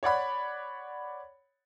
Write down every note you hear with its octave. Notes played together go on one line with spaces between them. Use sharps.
C#5 D5 F#5 B5